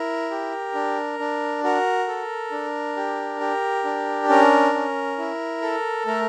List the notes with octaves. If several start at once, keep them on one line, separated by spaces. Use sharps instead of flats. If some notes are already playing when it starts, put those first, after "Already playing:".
Already playing: E4 A#4
G4
D4
D4
F#4 A#4
A4
D4
G4
G4
D4
C#4 A#4
C#4
E4
A4
A3 A#4